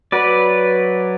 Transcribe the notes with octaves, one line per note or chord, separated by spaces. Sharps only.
F#3 B4 D5